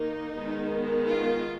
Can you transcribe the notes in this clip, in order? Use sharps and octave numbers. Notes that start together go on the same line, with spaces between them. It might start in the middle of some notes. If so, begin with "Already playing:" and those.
Already playing: D#3 A#3 D#4
D#3 G#3 B3
F4